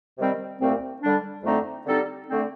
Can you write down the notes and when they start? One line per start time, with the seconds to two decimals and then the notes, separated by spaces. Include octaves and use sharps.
0.18 C3 D#3 G3 C4
0.60 C2 A#2 A3 C4
1.02 D3 G3 D4
1.44 F2 D3 A3 C4 D#4
1.86 D3 G3 C4 D#4 A4
2.28 D3 A3 C4